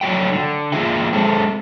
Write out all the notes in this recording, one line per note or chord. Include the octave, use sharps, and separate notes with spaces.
F2 D3 F#3 A3 G5
D3
F2 A#3 F4 G#4 E5 G5
G#3 C4 A4